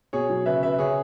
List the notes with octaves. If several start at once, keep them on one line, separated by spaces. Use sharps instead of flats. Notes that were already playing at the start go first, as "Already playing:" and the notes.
B2 G#4 C#5
F#3
C#3 B4 E5
C#3 B4 E5
C#3 G#4 C#5